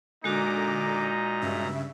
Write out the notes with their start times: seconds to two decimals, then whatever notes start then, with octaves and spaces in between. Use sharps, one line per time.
0.24 A#2 D3 G#3 D#4 F#4 A#5 D6
1.41 G2 C#3 E5